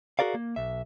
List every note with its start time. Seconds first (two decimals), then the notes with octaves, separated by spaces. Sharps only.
0.19 F#4 G#4 A#4 D5 F5
0.35 A#3
0.56 B1 E5